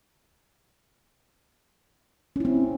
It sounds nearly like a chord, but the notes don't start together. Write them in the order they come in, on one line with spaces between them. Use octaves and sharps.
C#4 E4 C4